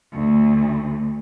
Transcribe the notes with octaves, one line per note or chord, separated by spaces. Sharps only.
D2